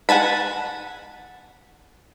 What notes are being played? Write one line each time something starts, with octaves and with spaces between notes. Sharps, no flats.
F#5 G#5 A5 B5